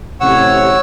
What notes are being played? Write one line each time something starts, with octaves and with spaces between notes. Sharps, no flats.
A1 C3 C#5 F#5 E6